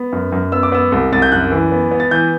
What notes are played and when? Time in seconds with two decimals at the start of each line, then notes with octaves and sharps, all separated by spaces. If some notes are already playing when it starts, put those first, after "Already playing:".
Already playing: B3
0.13 F#2
0.32 F#2
0.52 B3 E6
0.63 D6
0.72 B3 E6
0.92 C2
1.12 C2 A6
1.22 G6
1.32 F#2 F#6
1.52 E3
1.72 B3
1.91 B3
2.00 A6
2.11 E3 G6